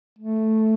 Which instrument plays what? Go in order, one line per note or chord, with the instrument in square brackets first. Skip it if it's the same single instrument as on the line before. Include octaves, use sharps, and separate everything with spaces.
[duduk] A3